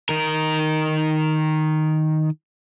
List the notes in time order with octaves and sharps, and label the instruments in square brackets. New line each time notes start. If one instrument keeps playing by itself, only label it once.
[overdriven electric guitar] D#3 A#4